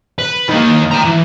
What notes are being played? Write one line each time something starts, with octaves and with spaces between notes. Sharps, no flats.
B4
D#3 A#3
G5 A#5
E3